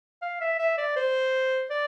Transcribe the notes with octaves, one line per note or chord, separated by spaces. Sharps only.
F5
E5
E5
D5
C5
D5